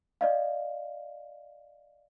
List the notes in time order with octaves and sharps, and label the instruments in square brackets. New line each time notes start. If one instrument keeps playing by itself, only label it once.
[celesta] D5 D#5 F5